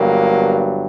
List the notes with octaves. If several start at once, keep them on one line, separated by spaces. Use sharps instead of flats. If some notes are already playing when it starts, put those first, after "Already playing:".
Already playing: G1 G2 F#3 A#3